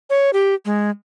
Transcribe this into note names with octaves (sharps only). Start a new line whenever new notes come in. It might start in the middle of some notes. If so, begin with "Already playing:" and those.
C#5
G4
G#3